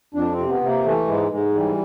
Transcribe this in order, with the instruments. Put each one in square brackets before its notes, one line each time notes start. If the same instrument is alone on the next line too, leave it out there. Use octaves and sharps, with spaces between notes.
[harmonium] F2 D4
C4
C3
B3
C3
A#3
E3 A3
G#2 G#3
G#2 G#3
E3 G3